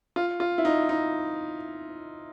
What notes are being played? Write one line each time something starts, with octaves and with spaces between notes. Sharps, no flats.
F4
F4
E4
D#4
D#4